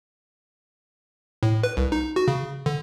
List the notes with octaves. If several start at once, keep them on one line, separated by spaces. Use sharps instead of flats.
A2
B4
C2
D#4
F#4
C#3
D3